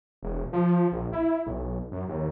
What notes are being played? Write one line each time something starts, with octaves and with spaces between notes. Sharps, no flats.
E1
F3
A#1
E4
B1
F#2
D#2